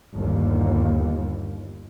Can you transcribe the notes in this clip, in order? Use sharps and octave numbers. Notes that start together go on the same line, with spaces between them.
G1 D#2